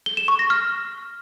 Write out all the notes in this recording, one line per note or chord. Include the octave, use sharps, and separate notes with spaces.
G7
E7
C#6
A#6
F6